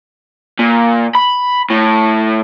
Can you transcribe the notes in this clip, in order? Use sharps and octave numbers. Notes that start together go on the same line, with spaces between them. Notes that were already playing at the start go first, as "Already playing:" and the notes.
A#2
B5
A2